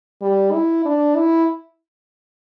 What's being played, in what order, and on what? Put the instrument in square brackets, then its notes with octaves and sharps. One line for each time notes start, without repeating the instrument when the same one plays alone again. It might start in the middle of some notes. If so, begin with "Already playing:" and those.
[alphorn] G3
E4
D4
E4